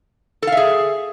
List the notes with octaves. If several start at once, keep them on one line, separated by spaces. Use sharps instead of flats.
G#4 A4 E5 F5